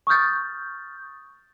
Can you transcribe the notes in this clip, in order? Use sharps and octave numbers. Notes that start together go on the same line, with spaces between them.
C#6 D#6 F6 G6 A6